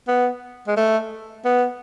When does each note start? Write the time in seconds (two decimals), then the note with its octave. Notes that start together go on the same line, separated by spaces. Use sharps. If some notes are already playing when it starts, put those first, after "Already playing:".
0.08 B3
0.67 G#3
0.77 A3
1.45 B3